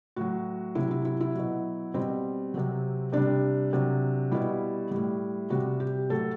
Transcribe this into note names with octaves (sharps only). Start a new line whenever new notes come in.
A2 F#3 F#4
C3 F#3 E4
E4
E4
E4
B2 F#3
B2 G3 C4
C3 F#3
C3 G3 D4
C3 F#3
B2 G3 E4
A2 G3
C3 G3 F#4
G4
A2 F#3 A4